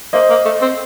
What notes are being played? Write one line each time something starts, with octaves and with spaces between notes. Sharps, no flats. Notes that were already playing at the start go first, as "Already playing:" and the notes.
A#3 C5 D#5
A#3
A3
C4